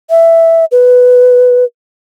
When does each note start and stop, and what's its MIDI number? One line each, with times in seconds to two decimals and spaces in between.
0.10 0.65 76
0.72 1.64 71